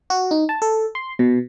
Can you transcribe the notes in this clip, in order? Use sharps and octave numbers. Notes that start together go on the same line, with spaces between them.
F#4
D#4
A5
A4
C6
B2